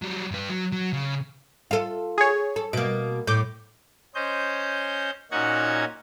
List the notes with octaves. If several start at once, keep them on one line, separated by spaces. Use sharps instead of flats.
F#3 G3
G2 B4
F#3
F#3
C#3
F4 A4
G#4 C#5
A4
B2 A#3 D7
A2 D6 G6
C#4 C5 D#5 G6
A#2 C#4 D#4 F#4 F#5 G#6